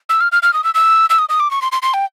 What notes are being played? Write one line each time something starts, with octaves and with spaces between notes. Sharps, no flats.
E6
F6
F6
F6
D#6
E6
E6
E6
D#6
D#6
D6
C#6
C6
C6
C6
G5